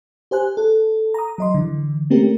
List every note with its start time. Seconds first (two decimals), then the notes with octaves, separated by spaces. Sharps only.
0.31 G4 C5 G#5 F#6
0.57 A4
1.14 A#5 D#6
1.38 F#3 D#5 C6
1.54 D3 E3
2.10 A3 A#3 C4 C#4 G4 A#4